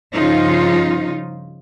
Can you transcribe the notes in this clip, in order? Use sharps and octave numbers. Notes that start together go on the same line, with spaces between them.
G2 C#3 F3 D#4 F4